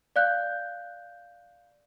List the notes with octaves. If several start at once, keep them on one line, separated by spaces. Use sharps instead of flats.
D5 F5 F#6 G6